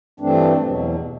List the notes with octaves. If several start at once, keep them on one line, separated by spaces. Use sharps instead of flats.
G2 E3 A3 C4 D4
E2 B2 F#3